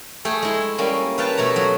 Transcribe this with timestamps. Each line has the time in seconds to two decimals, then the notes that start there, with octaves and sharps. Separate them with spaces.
0.25 A3 G#4 G5
0.42 G#3 E4
0.78 G3 A#3 C#4
1.18 B4 F5 G5 A5
1.37 B2 A3 C#5 A#5
1.56 F#3